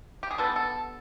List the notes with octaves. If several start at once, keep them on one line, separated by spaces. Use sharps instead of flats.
G4
G#4
D3 G3 B3 A4
A4